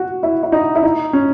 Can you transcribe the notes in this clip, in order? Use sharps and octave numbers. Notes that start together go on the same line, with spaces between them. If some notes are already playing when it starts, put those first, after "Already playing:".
Already playing: F#4
E4
E4
D#4
E4
D#4
C#4